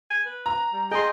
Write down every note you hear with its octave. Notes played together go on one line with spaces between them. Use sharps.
G#5
B4
A#5
G3
G#4 D#5 G5 C6